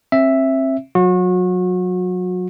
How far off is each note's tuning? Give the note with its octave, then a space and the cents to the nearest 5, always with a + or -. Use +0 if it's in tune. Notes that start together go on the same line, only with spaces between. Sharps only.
C4 +35 E5 +0
F#3 -20 F#4 -35